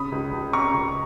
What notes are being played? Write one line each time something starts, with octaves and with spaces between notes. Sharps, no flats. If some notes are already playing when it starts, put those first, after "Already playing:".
Already playing: C#3 B5 D#6
C#2
C#2
C#3 A#5 C#6
C#2